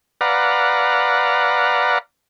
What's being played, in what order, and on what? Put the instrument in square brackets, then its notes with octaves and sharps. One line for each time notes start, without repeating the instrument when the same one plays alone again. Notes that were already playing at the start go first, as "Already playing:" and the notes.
[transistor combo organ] B4 D5 F5 F#5 A#5